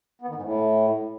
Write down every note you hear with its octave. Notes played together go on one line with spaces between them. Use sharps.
B3
D#3
G#2
A2